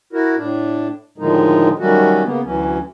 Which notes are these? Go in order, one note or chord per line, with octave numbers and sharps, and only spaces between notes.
E4 F#4 A#4
A2 D4
A2 D3 D#3 F3 G#3 D#4
D#3 F#3 G3 A3 C#4 F#4
C#3 A#3 B3
D2 E3 F#3 C#4